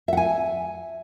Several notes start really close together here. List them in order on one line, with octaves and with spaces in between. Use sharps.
E5 F#5 G#5